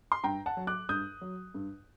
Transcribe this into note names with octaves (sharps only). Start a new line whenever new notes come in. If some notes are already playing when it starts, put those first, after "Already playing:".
C6
G2 G5 A#5
F#5 A5
F#3
D6 F#6
G2 D#6 G6
F#3
G2